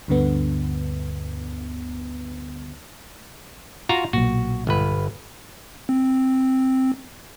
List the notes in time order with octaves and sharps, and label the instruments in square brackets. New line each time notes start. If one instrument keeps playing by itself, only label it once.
[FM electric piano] D2 G2 D3 B3
[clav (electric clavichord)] F4 F#4 A#5
[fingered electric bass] B1 A#2 [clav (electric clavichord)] F#4
[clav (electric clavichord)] G1 B4
[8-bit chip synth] C4